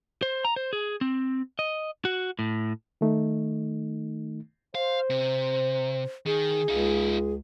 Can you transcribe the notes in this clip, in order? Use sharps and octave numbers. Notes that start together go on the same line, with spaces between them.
C5
A#5
C5
G#4
C4
D#5
F#4
A2
D#3 A3 D#4
C5 F5
C3
D#3 G#4
C#2 D#4 F4